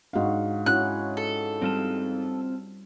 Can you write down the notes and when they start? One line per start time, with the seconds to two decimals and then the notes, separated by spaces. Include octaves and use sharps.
0.13 G#2 D4 F#4 F5
0.66 C#4 E4 F#4 F#6
1.17 A4
1.62 G3 C4 F4 A5